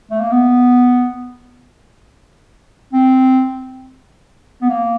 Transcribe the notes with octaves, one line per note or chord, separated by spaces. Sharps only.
A3
A#3
B3
C4
B3
A#3